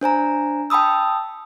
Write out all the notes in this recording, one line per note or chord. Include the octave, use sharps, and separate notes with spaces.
D4 C5 G#5 A#5
G5 A5 B5 D#6 E6